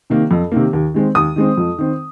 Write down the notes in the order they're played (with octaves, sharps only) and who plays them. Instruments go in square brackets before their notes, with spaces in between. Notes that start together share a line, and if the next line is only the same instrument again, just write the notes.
[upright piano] C3 D#3 A#3
F2
C3 D#3 A#3
D#2
D#3 G#3 C4
D#2 D#6
D#3 G#3 C4
F2
D#3 C4